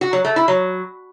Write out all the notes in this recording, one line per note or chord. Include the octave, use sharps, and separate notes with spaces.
F#4
F#3
A3
E4
F#3